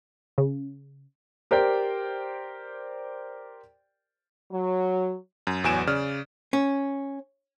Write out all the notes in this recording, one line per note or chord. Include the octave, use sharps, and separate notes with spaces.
C#3
G4 A#4 C5 D5 G5
F#3
F#2
A1 E2 F#3 G#5 D7 E7
C#3 D5 F6
C#4